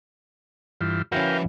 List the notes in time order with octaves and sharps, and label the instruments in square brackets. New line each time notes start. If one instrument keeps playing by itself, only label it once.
[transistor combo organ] G2 E3 F4
[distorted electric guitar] F3 B4 [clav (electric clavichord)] C#4 E4 F#4 [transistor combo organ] A#4 F5 G5